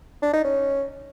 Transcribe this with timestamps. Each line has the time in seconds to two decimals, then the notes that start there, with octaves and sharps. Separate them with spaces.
0.22 D4
0.33 D#4
0.44 C#4